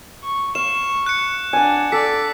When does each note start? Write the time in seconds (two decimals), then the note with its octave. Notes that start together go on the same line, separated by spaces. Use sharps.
0.23 C#6
0.55 F5 C#6 E7
1.06 F#6 C#7
1.53 D4 F#5 G#5
1.92 A4 D5 B6